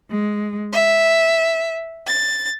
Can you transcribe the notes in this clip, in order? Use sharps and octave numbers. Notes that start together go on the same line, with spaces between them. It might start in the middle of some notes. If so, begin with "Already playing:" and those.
G#3
E5
A6